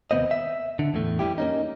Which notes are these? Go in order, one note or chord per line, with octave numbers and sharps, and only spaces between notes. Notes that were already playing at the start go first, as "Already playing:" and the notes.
D#2 C3 A#3 B3 C5 D#5
E5
D3
E2 A2 A3
F2 E3 F3 G3 E4 G4
A#3 C#4 D#4